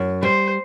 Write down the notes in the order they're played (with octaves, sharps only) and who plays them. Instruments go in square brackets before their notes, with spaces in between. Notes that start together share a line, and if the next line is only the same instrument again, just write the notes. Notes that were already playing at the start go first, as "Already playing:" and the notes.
Already playing: [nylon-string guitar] F#2
[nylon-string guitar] G3 [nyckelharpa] C5